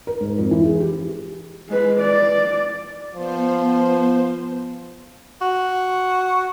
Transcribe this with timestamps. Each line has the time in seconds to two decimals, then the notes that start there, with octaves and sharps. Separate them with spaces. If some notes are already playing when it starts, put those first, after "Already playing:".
0.07 A#4
0.21 G#2
0.39 F2
0.51 E3
0.65 G#4
0.80 G4
1.69 G#3 B4
2.00 D5
3.15 F3 B3 C5
5.41 F#4